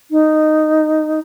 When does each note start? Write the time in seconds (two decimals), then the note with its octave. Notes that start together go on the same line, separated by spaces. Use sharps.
0.11 D#4